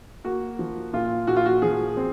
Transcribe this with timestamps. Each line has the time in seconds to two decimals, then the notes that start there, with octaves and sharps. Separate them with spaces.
0.24 A#3 F#4
0.59 F3
0.93 A#2 F4
1.27 A#2 F#4
1.36 F4
1.46 F#4
1.62 F3 G#4
1.97 C4